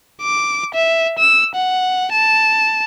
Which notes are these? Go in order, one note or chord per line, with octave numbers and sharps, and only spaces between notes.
D6
E5
E6
F#5
A5